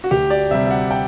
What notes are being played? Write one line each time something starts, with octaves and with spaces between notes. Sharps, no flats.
F#4
D2 G4
D5
C3 G3 E5
E5
F#5
G5